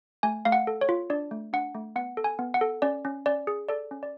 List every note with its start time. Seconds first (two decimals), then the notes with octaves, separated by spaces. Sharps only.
0.23 A3 G#5
0.45 A3 F5
0.52 F#5
0.67 A4
0.81 C#5
0.89 F4
1.10 D4 D5
1.31 A3
1.53 D4 F#5
1.74 A3
1.96 B3 F#5
2.17 A4
2.24 G#5
2.39 B3
2.54 F#5
2.61 A4
2.82 C#4 D5
3.05 C#4
3.26 C#4 D5
3.47 G#4
3.68 A4 D5
3.91 C#4
4.03 D5